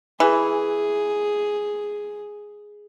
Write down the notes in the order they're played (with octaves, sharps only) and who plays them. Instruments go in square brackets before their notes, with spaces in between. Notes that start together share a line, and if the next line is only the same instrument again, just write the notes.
[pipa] E3 [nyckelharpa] G#4